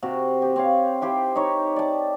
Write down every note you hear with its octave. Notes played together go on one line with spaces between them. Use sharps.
C3 F#4
G4 C5
C4 C#5 F5
E4 G4 C5
D#4 C#5
D5 A5